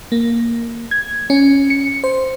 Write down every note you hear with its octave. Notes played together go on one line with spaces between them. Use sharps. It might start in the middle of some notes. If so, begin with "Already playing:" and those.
A#3
G#6
C#4
C#7
C5